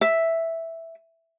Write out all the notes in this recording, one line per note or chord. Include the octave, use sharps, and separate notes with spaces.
E5